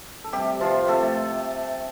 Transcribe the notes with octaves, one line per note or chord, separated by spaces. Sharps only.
A4
C3 G3 G4
C3 F3 F4
C3 A3 A4